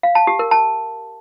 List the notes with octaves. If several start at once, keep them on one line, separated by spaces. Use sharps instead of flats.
F5
A5
G4
A#4
A5